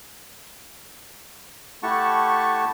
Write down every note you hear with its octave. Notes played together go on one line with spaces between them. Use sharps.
A3 E4 G4 F#5 A5 C#6